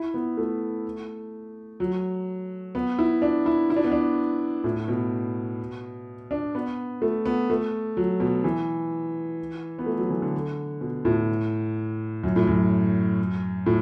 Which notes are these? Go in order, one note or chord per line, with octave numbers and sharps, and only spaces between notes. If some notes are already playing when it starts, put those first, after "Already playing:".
Already playing: E4
B3
A3
F#3
B3
E4
D4
E4
E4
D4
B3
D4
A2
B2
D4
B3
A3
B3
A3
F#3
B2
E3
B3
A3
F#3
E3
D3
B2
A2
F#2
A2
F#2
A2